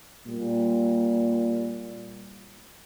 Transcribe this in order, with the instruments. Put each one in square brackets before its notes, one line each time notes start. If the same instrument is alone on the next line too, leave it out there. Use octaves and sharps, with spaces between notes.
[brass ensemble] A#2 G3